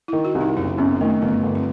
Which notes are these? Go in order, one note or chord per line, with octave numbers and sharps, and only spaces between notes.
E4
D#3
F#4
C2
D#4
F#1 C4
F#2 B3
D#3 A3
G1 B3
G1
C4